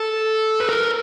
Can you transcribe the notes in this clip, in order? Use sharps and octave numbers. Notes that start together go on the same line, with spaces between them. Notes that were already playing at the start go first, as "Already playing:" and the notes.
Already playing: A4
B4
A#4